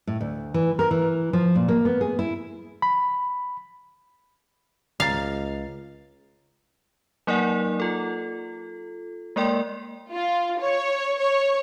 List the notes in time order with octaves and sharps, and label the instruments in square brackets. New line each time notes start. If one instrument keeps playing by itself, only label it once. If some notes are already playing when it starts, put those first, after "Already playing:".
[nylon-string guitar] A2
D2
E3
A#4
E3
F3
A#2
A#3
B3
G#4
E4
[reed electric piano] B5
[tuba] C#2 [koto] F5 [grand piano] A#5 A6
[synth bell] F#3 A#3 D#4 A#4 D5 F#5
F4 A4
G#3 A#3 A#4 D5 G5 C6
[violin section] F4
C#5
C#5